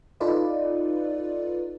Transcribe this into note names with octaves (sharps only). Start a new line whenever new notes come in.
D#4 F4 A4 B4 D5